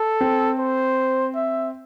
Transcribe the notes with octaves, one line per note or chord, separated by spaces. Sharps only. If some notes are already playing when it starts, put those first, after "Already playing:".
Already playing: A4
C4
C5
E5